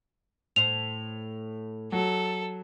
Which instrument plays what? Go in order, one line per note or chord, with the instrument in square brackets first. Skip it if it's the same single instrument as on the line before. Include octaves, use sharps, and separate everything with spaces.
[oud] A2 C5 [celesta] F7
[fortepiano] F#3 [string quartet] A4